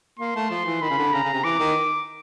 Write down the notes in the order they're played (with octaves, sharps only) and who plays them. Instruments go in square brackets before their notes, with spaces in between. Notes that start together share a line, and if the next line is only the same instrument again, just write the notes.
[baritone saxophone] A#3 [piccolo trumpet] C6
[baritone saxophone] A3
F3
E3
[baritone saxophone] D#3 [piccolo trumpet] B5
[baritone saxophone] C#3
D3
[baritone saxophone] C#3 [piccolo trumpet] A#5
[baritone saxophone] C#3
C3
[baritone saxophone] E3 [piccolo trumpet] D6
[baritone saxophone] D#3